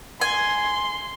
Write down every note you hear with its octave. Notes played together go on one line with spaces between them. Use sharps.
G#5 C6